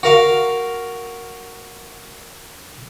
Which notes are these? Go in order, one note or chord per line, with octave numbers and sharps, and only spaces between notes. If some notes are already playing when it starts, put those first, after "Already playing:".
F#4 A#4 F5